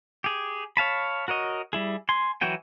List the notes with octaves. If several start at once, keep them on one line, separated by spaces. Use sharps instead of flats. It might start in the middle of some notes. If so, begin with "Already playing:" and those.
G4 G#4
C#5 F5 A5 B5
F#4 A#4 C#5 D#5
G3 E4 G#4
G#5 C6
E3 F#3 F#4 G5 G#5